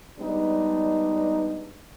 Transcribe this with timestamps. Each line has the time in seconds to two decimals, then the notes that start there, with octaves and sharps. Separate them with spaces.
0.19 G3 G#3 B3 D4 D#4